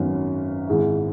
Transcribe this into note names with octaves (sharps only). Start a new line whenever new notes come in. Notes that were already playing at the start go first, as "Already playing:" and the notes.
Already playing: G#1 F#2 F#3 B3
G#1 G#2 G#3 E4